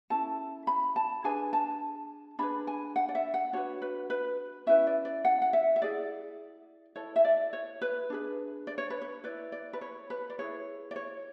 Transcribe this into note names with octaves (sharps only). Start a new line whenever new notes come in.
C#4 E4 A4 A5
B5
A5
D4 G#4 B4 G#5
A5
D4 G#4 B4 B5
G#5
F#5
D5
E5
F#5
D4 F#4 B4 C#5
B4
B4
C#4 E4 B4 E5
D5
D5
F#5
F#5
E5
E5
E4 G#4 B4 D5
E4 A4 C#5
E5
D5
C#5
B4
D4 G#4 B4
D5
C#5
B4
C#5
E4 B4 D5
D5
B4
C#5
B4
D5
E4 G#4 B4 C#5
D5
C#5